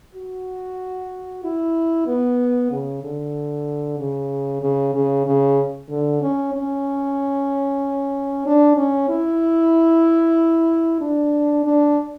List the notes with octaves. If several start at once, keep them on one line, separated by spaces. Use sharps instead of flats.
F#4
E4
B3
C#3
D3
C#3
C#3
C#3
C#3
D3
C#4
C#4
D4
C#4
E4
D4
D4